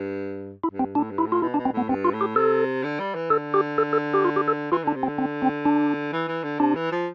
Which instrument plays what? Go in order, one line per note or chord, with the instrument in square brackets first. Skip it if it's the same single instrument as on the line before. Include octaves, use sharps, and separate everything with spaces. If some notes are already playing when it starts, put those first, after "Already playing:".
Already playing: [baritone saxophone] G2
[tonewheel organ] E4
[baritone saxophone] G2
[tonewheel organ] C4
[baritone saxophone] A2 [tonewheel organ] D4
[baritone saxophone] G2
[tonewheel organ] E4
[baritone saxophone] A2
[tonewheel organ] F4
[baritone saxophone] B2 [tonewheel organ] E4
[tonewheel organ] D4
[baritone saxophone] B2
[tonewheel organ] C4
[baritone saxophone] A2 [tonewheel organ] B3
[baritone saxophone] G2 [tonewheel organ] C4
[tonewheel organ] F4
[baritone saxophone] A2
[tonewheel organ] G4
[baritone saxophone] C3 [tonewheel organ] A4
[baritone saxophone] D3
G3
E3
[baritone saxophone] D3 [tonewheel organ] A4
[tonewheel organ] G4
A4
A4
G4
F4
G4
A4
[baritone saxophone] E3 [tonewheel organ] F4
[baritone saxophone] D3 [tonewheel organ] D4
[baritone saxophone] C3
[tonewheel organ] C4
[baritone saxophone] D3
[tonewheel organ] C4
C4
D4
[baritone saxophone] E3
E3
D3
[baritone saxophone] C3 [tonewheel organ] D4
[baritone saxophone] E3
F3